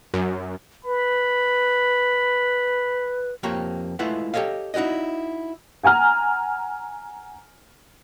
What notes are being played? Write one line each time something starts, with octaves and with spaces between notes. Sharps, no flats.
F#2
B4 B5
F2 A#3 G4 C#5 A#5
G#3 A3 E4 F4 B4 F#5
G4 A4 C#5 D#5 F5
D#4 E4 F#4 D5 D#5
F#5 G#5 A#5 F6